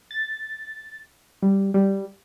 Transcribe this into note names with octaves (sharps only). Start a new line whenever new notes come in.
A6
G3
G3